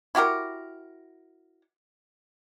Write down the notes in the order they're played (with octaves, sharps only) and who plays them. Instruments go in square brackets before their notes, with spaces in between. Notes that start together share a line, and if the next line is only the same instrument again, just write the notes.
[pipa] E4 F#4 G4 A#4